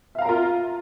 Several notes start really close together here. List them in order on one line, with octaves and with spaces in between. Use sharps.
E5 F5 A#5 A#4 F4